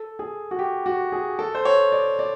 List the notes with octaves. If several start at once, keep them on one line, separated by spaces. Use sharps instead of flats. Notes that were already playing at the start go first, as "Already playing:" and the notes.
Already playing: A4
G#4
F#4
G4
F#4
G#4
A4
C5
C#5
D5
D5